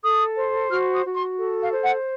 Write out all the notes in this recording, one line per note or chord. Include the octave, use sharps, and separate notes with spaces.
A4 D#6
C5
F#4 F6
D#6
F#4
C6
A4
F5
C5
F#5